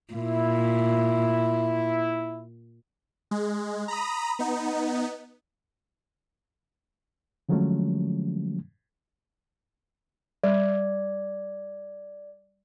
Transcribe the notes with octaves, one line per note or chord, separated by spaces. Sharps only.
A#2 E4
G#3
A#5 B5 D#6
B3 D#4
D3 F3 F#3 G#3 A3 C#4
G3 D5